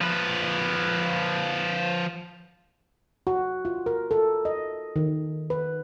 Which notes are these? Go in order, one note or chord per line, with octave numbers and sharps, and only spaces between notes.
F3 B4
F#4
F4
A#4
A4
D#5
D#3
B4